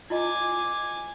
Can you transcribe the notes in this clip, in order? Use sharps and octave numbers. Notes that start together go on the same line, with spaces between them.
E4 F4 D#5 G#5 D6